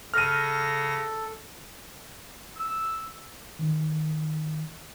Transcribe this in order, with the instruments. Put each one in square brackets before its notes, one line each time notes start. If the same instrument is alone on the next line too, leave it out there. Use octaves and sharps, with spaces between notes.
[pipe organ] C#3 A#6 [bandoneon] A4 [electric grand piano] F6 D#7
[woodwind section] E6
[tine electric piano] D#3